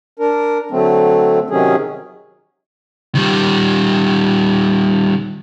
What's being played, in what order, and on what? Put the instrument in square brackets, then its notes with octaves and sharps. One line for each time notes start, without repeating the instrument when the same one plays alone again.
[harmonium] D4 A#4
D3 F#3 A3 C4
C3 D#3 F#3 C#4 G#4
[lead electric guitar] D#3 G3